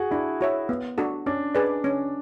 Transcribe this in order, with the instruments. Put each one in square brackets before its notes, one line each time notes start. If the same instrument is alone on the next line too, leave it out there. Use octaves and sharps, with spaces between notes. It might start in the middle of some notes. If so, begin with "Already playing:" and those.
Already playing: [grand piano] F#4 G#4
[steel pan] D4 [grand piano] E4
[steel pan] F#4 C#5 E5
B3
D4 F#4 A4
[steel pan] C#4 [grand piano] D4
[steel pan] G#4 B4 D5
C#4